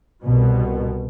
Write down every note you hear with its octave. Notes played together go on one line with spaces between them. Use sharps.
C2 B2